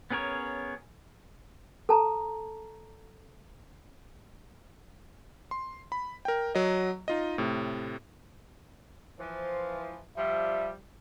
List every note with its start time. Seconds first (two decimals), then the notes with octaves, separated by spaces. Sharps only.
0.10 B3 C#4 G#4 A#4 C#5
1.89 A4 A5 A#5
5.51 C6
5.92 B5
6.25 A#4 G5
6.55 F#3 D#5
7.08 D#4 F4 D#5
7.38 A2 C3
9.20 E3 F3 C5
10.17 F3 G3 E5